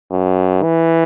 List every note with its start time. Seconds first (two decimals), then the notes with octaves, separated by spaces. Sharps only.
0.11 F#2
0.63 E3